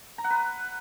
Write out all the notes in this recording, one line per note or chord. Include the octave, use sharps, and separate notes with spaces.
A#5
F#5
B4